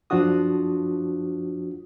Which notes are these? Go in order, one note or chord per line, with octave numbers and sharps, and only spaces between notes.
F#2 F3 D4 F4 F#4 D#6